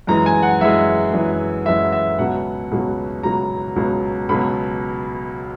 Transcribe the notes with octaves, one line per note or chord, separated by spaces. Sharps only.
F#2 E3 G#3 A#5
G#5
F#5
F#2 E3 G#3 E5
F#2 E3 G#3
F#2 E3 G#3 E5
E5
C#2 B2 F#3 F#5
C#2 B2 F#3
C#2 B2 F#3 A#5
C#2 B2 F#3
C#2 B2 F#3 B5